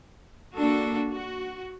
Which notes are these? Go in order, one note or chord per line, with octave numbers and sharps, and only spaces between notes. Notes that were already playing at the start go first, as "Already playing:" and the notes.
A#3 D4 F#4 A4
F#4